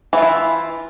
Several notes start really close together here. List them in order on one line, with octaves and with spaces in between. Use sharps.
E3 F4 E4